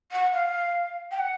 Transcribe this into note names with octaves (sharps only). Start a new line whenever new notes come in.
F#5
F5
G5
F#5